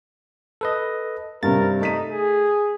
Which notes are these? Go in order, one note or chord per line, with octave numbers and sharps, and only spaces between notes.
A4 B4 D#5
G2 C3 A#4 A6
A3 D#4 B6 D#7
G#4